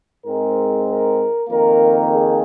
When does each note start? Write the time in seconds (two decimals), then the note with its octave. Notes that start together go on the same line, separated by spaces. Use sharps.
0.24 G#2 G#3 C4 A#4
0.88 A#4
1.49 F2 D#3 A#3 A#4
2.12 G#4